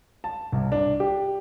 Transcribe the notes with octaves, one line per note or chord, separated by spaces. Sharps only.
A5
C2
D4
G4